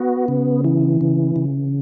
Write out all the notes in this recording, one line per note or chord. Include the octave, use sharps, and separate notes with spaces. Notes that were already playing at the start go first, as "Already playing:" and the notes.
Already playing: B3 F#4
C#3
E3
C#3
C#3